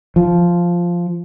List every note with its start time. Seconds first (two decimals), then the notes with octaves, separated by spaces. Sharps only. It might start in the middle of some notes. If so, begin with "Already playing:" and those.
0.16 F3